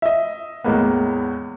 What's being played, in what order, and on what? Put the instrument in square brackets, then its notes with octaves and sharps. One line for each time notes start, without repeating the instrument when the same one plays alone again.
[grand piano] D#5 E5
E2 A2 G#3 A#3 B3